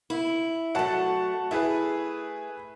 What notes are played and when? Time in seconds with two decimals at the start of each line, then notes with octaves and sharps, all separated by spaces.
0.10 E4
0.75 F#3 A3 F#5 A5
1.51 A3 E4 G#4 B4